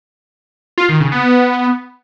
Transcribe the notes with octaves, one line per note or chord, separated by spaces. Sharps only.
F4
D#3
C#3
B3